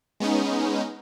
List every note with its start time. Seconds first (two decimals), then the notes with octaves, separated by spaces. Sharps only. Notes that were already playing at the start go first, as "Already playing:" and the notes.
0.20 G#3 B3 C#4 D#4